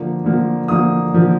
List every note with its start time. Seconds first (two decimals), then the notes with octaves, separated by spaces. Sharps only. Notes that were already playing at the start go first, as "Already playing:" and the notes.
Already playing: D3 F3 A#3
0.24 D3 F3 A#3
0.68 D3 F3 A#3 D#6
1.13 D3 F3 A#3